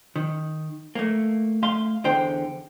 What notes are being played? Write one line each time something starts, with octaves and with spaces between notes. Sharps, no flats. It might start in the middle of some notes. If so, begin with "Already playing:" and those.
D#3
A3 A#3
A3 F5 C6
E2 D3 C5 G5